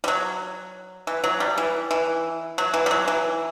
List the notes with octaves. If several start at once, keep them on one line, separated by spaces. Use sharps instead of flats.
G3
F#3
E3
F#3
G3
E3
E3
F#3
E3
G3
F#3
E3